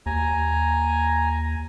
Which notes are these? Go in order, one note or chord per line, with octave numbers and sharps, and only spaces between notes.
D#2 G#5 A#5